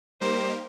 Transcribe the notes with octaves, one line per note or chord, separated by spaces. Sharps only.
G3 A#3 D#4 G4 A#4 C5